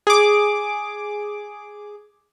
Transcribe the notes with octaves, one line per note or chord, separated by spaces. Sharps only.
G#4 D6